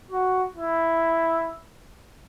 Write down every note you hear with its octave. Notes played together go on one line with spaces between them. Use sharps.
F#4
E4